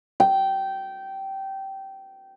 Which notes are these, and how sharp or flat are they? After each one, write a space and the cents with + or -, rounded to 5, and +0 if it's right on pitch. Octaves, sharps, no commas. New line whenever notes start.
G5 -15